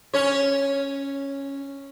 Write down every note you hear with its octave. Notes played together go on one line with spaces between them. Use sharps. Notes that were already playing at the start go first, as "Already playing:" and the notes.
C#4 C#5